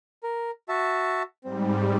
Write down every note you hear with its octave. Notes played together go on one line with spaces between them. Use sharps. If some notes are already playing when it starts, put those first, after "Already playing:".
A#4
F#4 E5 A5
G#2 G3 C4